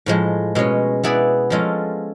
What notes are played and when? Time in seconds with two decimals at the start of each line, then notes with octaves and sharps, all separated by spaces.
0.06 A2 F3 G#3
0.55 B2 G#3 C#4
1.03 B3 E4 G#4 B4 D5
1.50 F3 G#3 C#4 F4 A4